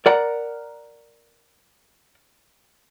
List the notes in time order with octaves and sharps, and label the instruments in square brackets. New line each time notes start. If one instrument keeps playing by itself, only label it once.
[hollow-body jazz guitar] A#4 D5 F#5 A#5